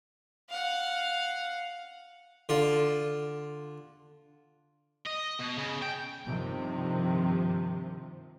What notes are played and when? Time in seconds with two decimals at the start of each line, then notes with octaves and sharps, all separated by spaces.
0.49 F5 F#5
2.49 D3 F4
5.06 D#5
5.39 B2
5.58 C#3
5.82 G5
6.25 G2 C3 D#3 F3